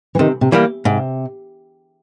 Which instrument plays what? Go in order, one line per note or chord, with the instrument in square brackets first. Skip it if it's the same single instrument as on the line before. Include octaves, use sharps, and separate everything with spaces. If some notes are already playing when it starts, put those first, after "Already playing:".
[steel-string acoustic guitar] E3
[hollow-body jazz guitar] C3 [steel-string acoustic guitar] D#3
[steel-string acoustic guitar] C3
[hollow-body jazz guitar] E3 G3 A#3
[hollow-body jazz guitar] G#2 [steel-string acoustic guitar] C3